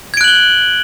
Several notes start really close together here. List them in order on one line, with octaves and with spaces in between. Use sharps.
G#6 D7 F#6 F#7 G7